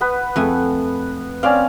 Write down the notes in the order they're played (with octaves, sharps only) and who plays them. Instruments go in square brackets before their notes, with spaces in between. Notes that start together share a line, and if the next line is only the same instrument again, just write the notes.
[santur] B3 B4
[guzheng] F2 A3 G#5
[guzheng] C4 [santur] C#4 D5 F5